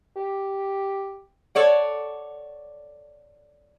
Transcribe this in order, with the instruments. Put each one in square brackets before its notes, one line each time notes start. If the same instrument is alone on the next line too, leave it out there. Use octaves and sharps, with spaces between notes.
[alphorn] G4
[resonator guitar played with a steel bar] A4 C#5 D5 F#5